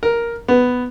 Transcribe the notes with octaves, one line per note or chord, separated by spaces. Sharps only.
A#4
B3